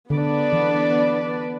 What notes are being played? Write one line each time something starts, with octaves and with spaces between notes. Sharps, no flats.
D3 B3 D4 B4 D5
E3